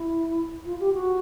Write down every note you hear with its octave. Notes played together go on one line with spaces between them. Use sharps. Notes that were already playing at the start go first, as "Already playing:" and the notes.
Already playing: E4
F4
G4
F#4